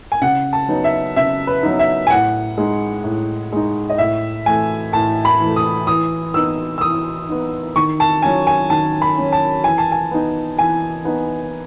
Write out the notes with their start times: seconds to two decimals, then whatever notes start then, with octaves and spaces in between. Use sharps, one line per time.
0.12 G#5
0.22 C#3 F#5
0.53 A5
0.68 F#3 B3 D#4
0.84 E5
1.16 C#3 E5
1.47 B4
1.63 F#3 B3 D#4
1.79 E5
2.07 G#5
2.10 A2 F#5
2.58 G#3 D#4
3.04 A2
3.52 G#3 D#4
3.90 D#5
3.98 A2 E5
4.46 E3 A3 G#5
4.93 A2 A5
5.25 B5
5.40 E3 A3
5.56 D#6
5.87 E3 D#6
6.34 B3 D#4 E6
6.78 E6
6.81 E3 D#6
7.29 B3 D#4
7.76 D#3 C#6
8.00 A5
8.22 F#3 C#4 G#5
8.47 G#5
8.70 D#3 A5
9.02 B5
9.18 F#3 C#4
9.32 A5
9.64 E3 G#5
9.78 A5
9.92 G#5
10.11 B3 D#4
10.59 E3 G#5
11.05 B3 D#4